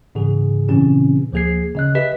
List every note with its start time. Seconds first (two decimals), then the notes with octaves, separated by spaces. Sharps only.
0.15 G#2 C#3 E3 G#4
0.69 A#2 C#3 E3 C4 C#4 G4
1.32 D2 F3 A#3 G#4 G#6 C7
1.75 C#3 D#5 F#6
1.95 G4 B4 D#5 E5 B6